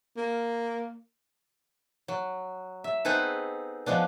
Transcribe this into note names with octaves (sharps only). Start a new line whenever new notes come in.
A#3
F#3
E5
B3 C4 D#4 G#4 A4 B4
F3 G#3 B3 D4